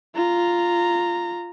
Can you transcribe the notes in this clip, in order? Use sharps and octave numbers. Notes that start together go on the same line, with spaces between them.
F4 A#5